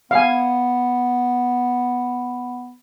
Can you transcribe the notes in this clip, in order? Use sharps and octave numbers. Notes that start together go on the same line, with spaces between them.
B3 F5 G#5